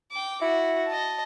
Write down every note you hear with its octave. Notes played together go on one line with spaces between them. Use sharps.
G5 D6
E4 F#4
D#5 A5